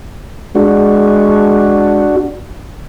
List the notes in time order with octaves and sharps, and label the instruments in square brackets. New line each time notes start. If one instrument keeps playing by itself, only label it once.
[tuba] G#3 [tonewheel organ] D4 F#4